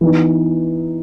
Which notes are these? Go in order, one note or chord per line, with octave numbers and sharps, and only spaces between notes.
E3 B3 D#4